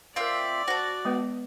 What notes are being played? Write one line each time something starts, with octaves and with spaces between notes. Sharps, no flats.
C4 F4 A#4 D5 E5 F5
F#4 C5 A5
G#3 B3 B4